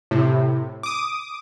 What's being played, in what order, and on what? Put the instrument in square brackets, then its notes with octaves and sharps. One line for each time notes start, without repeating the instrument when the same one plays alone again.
[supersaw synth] A2 C3
D6 D#6